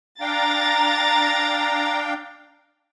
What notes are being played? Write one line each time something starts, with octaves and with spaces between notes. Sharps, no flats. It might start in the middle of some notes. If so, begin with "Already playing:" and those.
D4 F5 G5 A#5 A6